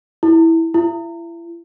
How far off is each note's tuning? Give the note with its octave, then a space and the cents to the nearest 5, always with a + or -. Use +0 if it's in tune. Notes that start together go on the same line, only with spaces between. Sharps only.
E4 -10
E4 +35